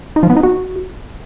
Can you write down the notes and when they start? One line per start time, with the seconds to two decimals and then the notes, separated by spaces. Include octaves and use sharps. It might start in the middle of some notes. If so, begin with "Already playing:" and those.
0.16 D#4
0.23 F3
0.30 B3
0.36 D#4
0.43 F#4